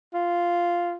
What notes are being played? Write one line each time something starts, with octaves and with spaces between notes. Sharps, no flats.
F4